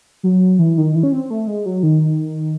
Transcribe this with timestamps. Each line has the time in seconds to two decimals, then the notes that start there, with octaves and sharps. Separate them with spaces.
0.23 F#3
0.59 E3
0.77 D#3
0.95 E3
1.03 C#4
1.12 C4
1.31 A3
1.47 G#3
1.66 F#3
1.83 D#3